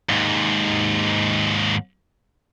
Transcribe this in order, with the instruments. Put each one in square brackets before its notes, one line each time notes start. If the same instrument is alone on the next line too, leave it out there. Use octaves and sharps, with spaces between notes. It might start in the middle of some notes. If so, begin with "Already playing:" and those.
[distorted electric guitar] D#2 G#2